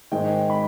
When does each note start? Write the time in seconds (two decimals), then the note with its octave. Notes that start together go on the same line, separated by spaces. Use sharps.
0.11 G#2 D#3 G#3 G5
0.50 B5